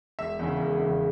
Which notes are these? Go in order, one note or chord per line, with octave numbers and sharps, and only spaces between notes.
E1 E5
E2 C#3
E1
E2 C#3